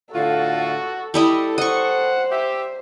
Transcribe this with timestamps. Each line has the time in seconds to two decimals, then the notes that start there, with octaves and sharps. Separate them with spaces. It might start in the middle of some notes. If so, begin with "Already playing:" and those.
0.14 A2 D3 F4 F#4 A4
1.14 G3 E4 A4 D#5
1.58 C5 D#5 F#5 C#6
2.31 G4 E5